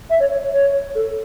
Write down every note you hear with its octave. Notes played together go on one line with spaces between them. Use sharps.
E5
C#5
C#5
C#5
A4